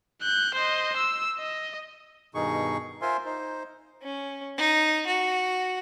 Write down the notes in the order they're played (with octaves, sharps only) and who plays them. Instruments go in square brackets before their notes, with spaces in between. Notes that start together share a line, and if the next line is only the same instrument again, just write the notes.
[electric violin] F#6 G6
C5 D#5
E6
D#5
[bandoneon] G2 B2 D#3 D#4 G#4 C#6
F4 A#4 C5 E5 G#5 C6
D#4 C5
[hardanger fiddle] C#4
D#4
F#4